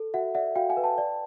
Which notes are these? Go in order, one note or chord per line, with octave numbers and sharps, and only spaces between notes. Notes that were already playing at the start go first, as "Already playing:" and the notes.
Already playing: A4
F#4 E5 F#5
D5 E5 F#5
F#4 F5 G5
F#5 G#5
B4
G5 A5
D5